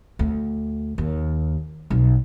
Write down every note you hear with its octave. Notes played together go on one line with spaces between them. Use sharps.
D2
D#2
B1